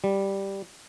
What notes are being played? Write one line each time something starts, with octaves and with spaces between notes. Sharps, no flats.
G3